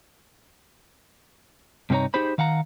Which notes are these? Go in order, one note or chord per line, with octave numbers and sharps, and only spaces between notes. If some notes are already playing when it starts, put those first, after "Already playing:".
G2 C3 C#4 D#4 C#5 A#5
D#4 G4 G#4 C5 B5
D#3 F5 F#5 A#5